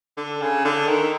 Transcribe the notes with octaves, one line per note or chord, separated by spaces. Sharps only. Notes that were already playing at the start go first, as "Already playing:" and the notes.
D3
C#3
D3
D#3